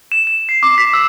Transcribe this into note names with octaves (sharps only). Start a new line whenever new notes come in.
E7
E7
C7
D6
B6
E6